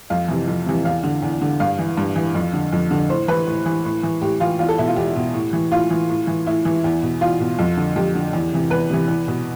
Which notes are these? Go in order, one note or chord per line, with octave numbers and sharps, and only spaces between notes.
F2 F5
C3 E3
F2
C3 E3
E2 F5
D3
E2
D3
G2 F5
E3
G2
E3
F2
D3
F2
D3
A2 C5
E3 B4
A2
E3
A2
E3
A2 G4
E3 F4
E2 F4
A4
B2 E4
F4
E2 G4
B2
A2
E3
A2 F4
E3
A2
E3
A2 E4
E3
E2
B2
E2 F4
B2
F2
D3
F2 G4
D3
E2
C3 E3
E2 B4
C3 E3
E2
B2